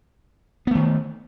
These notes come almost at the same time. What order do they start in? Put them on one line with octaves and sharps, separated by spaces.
B3 A3 D#3